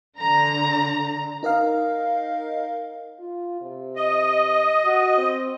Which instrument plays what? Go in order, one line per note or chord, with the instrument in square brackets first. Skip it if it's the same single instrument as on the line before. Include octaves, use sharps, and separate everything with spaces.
[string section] D3 A#5
[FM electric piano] D#4 A#4 D#5 F5
[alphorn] F4
C3
[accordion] D#5
[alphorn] F#4
C4